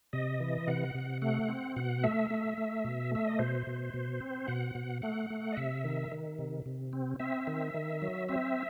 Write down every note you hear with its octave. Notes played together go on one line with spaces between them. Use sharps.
C3 D#5
E3
C3 F#5
C3
A3 F#5
C4
B2 F#5
A3 E5
A3
A3
B2
A3 E5
D#5
B2 C5
B2
B2
C4
B2 F#5
B2
A3 F#5
A3
D#5
C3 E5
D#3
D#3
C3
C3
C4
C4 E5
D#3
D#3
F#3
C4 E5